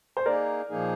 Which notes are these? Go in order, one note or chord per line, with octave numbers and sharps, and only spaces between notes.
C5
A#3 D#4 G#4 A#4 D5
A#2 F3 A#3 D#4 G#4